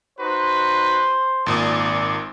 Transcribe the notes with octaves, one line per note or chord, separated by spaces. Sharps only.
D#4 F#4 B4 C5
G#1 A#2 D5 D#6